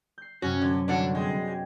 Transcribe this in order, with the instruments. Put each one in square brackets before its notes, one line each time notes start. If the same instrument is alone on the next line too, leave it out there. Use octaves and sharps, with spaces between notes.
[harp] G6 C7
[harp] F#2 C3 [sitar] C#4 [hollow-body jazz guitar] F#4
[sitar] D3
[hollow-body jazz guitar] C2 D3 F#5 [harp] C#4 F#4 [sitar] D4
[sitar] G#3 [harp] B3 F#4 G4
[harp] G4